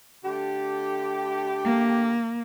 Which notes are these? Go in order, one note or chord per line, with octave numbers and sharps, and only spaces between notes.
D3 A3 G4
A#3